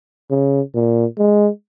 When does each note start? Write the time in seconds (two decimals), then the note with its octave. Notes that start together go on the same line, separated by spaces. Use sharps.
0.30 C#3
0.75 A#2
1.18 G#3